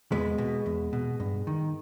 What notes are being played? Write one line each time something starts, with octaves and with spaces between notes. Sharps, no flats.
E2 G#3 B3
B2
E2
B2
G2
D#3